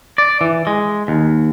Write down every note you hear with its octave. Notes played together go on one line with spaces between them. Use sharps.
D5
E3
G#3
D#2